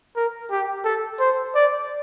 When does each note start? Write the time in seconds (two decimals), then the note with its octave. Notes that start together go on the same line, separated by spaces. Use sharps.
0.16 A#4
0.51 G4
0.84 A4
1.20 C5
1.55 D5